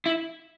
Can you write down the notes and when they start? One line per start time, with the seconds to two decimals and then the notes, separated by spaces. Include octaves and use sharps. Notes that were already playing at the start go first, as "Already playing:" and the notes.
0.06 E4